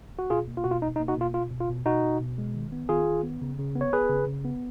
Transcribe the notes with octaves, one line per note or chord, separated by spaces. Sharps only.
F#4
B2 F4 G#4
A#3
F4
B2 F#4
F4
B2 D#4
D#4
A#3
D#4 F#4
B2 F4
B2 F4
B2
F4
B2
B2 D#4 F#4
B2
B2
G#3
D#3
B3
D#3 F4 G#4
D#3
B3
C#3
C#3
B3
C#5
B3 G#4 B4
C#3
C#3
B3